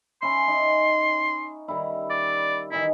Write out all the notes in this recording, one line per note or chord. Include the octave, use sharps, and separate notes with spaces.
C#4 E4 C6
D#4
D#3 G3 E4
D5
D#3 E3 D#4 E4